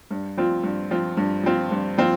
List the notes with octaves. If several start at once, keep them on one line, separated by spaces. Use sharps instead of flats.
G2
F3 C4 F4
G2
F3 C4 F4
G2
F3 C4 F4
G2
F3 C4 F4